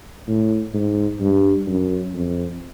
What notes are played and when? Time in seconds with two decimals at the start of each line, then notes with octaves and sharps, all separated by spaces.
0.28 A2
0.74 G#2
1.20 G2
1.67 F#2
2.14 F2